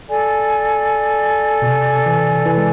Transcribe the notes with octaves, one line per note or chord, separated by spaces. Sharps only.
A4 D5 G#5
B2
C3
E3
E3
G#3